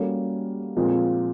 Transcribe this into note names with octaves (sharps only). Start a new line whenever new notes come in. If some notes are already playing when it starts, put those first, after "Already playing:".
Already playing: G3 A#3 C#4 F#4 A4
A#2 F3 G#3 C4